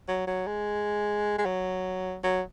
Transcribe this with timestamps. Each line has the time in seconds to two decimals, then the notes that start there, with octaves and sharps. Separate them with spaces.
0.09 F#3
0.27 F#3
0.47 G#3
1.39 G#3
1.46 F#3
2.24 F#3